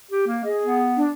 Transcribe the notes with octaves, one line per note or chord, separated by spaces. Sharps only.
G4
A#3
G#4 D#5
B3
D4